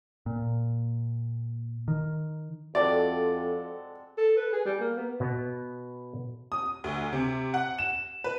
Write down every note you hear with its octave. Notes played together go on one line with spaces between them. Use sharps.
A#2
D#3
F2 G#3 C4 F#4 A4 D5
A4
B4
G#4
G3
A#3
B3
B2 B3
D#6
D2
C3
F#5
E7
B4